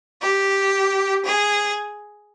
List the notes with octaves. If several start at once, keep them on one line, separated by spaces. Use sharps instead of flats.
G4
G#4